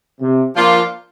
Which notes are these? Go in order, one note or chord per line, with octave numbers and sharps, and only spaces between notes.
C3
F3 A#3 D4 F4